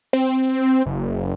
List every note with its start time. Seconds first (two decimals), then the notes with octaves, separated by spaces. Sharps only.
0.13 C4
0.86 F#1